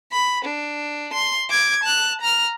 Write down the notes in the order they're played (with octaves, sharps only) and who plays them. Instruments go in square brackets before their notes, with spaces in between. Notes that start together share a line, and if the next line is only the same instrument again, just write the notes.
[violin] B5
D4
C6
D6 G#6
A5 F#6
A#5 F6